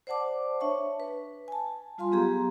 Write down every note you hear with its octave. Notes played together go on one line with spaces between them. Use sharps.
C5 D5 F#5 A5 D6
D4 C#5 E5 A5 C#6
B4
G#5 A5
G3 F4 F5 G#5 C6
F#3 B3 G4 G#4 A#5 C6